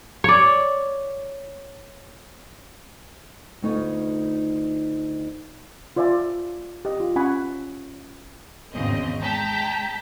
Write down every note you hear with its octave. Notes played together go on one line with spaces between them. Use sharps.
C#5 D5
D2 A3 B3 D#4 F4 C#5
F4 C5 D5 E5 G#5
G4 D#5
F4
C#4 F#5 G#5 B5 C#6
G#1 E2 C#3 C4 D#5
G#3 G5 A5 A#5 G6 B6